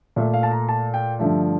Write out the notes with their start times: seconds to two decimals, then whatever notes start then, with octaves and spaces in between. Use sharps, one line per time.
0.16 A#2 A3 E5
0.34 F5
0.43 A5
0.51 A#5
0.69 A5
0.94 G5
1.19 G2 D3 F3 A3 E5